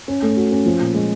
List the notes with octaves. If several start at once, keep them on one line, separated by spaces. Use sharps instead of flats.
C#4
A3
F#4
C#4
F3
A#2
G#3